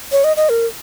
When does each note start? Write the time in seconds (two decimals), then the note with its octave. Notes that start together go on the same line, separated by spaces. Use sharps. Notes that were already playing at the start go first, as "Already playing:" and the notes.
0.12 C#5
0.24 D#5
0.37 D#5
0.49 A#4